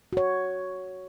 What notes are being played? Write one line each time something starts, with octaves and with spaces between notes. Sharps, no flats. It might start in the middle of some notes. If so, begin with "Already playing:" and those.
F#4 C#5